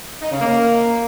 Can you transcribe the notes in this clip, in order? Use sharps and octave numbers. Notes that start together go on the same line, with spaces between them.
D#4
C#3
A#3